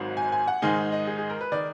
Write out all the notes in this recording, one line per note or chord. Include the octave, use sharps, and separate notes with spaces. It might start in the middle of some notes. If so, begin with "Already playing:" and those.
Already playing: G#1 G#2 D#3 F#3
G#5
G#5
F#5
G#2 D#3 G#3 D#4 G#5
D#5
G#4
G#4
A#4
B4
D#3 D5